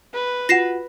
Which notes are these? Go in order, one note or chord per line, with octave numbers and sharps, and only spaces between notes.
B4
F4 F#4 F#5 A#6 C7 E7